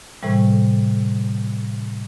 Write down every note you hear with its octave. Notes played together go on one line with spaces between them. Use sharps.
A2 C3 E3 G3